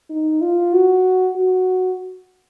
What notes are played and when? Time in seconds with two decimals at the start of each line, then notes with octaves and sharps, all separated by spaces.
0.10 D#4
0.42 F4
0.73 F#4
1.36 F#4